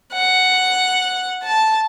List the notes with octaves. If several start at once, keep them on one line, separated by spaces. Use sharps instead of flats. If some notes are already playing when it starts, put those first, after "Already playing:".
F#5
A5